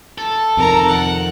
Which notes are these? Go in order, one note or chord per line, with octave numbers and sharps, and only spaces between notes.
A4
F2 C3 D#3 A#4 A#5
F#5